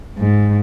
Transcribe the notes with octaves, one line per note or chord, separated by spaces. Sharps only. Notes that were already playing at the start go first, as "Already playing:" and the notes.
G#2